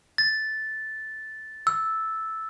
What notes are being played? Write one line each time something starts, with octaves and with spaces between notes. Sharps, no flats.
A6
E6